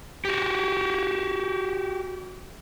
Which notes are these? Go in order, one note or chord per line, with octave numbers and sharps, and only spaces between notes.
F#4 G4